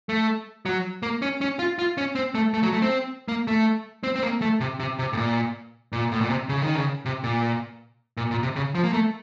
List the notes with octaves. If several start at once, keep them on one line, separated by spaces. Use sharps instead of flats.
A3
F#3
A#3
C#4
C#4
F4
F4
C#4
C4
A3
A3
F#3
A3
C4
A#3
A3
C4
C4
A#3
A3
C3
C3
C3
A2
A#2
A#2
A2
A#2
C3
C#3
D#3
C#3
C3
A#2
A#2
A#2
C3
C#3
F3
A#3
A3